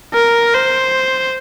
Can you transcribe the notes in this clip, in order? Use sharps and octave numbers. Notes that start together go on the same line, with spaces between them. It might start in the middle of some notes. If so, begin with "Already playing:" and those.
A#4
C5